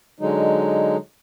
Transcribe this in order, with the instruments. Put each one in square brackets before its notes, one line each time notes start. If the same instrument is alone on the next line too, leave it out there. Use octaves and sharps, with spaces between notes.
[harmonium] D3 F#3 G#3 D#4